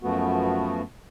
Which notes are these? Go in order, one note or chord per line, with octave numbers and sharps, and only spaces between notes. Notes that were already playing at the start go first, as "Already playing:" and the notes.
F#2 F3 A3 B3 F#4